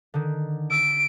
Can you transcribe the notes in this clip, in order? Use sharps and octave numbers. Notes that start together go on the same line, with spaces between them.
D3 D#3
E6 B6 D7